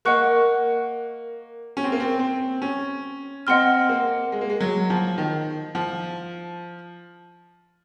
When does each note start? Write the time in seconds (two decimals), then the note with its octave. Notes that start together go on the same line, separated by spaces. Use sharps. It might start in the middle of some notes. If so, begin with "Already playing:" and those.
0.05 A#3 A#4 D#5 F#5 C#6 F#6
1.77 C#4
1.84 C4
1.92 A#3
2.00 C4
2.19 C4
2.62 C#4
3.47 C4 D#5 F#5 C6 F6
3.89 A#3
4.32 G#3
4.41 A#3
4.50 G#3
4.60 F#3
4.90 F3
5.18 D#3
5.75 F3